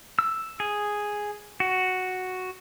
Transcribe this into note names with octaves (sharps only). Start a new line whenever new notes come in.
E6
G#4
F#4